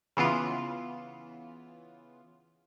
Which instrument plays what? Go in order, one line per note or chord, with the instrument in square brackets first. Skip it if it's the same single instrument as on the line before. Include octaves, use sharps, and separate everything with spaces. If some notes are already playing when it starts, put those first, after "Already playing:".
[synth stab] C#3 E3 B3 F4